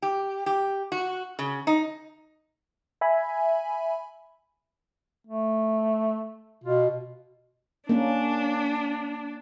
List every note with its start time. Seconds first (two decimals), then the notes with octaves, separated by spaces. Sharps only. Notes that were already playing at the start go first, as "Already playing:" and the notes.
0.02 G4
0.46 G4
0.92 F#4
1.39 C#3
1.67 D#4
3.01 E5 G#5 B5
5.27 A3
6.64 B2 F4
7.89 A#3 C#4 D4